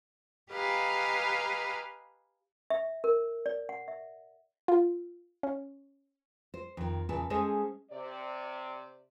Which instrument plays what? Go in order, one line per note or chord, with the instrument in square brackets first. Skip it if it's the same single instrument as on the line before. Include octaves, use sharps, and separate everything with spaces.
[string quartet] G4 B4 D#5 F5 G#5 A#5
[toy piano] E5
A#4
D5
F#5
E5
[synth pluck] F4
C#4
[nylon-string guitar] C5
F2 D#3
E2 A#2 C#3 B4 A5
G#3 C#4 G#4 A4 C5 D#5
[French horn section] C3 D5